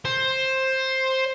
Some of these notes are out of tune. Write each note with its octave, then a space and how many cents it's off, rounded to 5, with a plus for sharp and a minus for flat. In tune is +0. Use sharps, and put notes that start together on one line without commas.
C5 +10